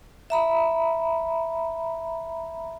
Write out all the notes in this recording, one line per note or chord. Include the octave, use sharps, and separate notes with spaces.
E5 A#5 B5